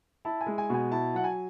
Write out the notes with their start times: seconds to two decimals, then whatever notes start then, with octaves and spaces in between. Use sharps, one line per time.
0.25 E4 A5
0.41 G#5
0.46 G#3
0.58 G#5
0.69 B2 G#5
0.91 E4 A5
1.14 F#3 F#5
1.24 G#5